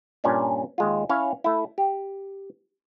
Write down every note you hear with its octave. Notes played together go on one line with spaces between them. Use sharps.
G2 A#2 C#4 D4
D#2 G#3 F4
C#4 E4 C#5 F5
A3 E4
G4